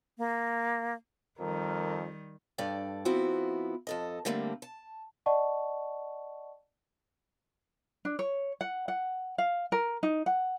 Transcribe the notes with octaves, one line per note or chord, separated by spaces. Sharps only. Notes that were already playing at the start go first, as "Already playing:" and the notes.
A#3
F2 D#3 G3 A#4
G2 A4 D5 G5
F3 B3 C4 E4 F#4
F2 A4 D#5
D3 G3 A3 A#3 C4
A5
D5 D#5 F#5 A5 C#6
D4
C#5
F#5
F#5
F5
A#4
D#4
F#5